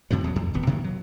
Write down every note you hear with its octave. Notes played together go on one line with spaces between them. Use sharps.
F#2 C3 D#3 F#3
D#2 F#3
F2
D#1 G#1 B3
B2 D#3 F#3 A#3
F#3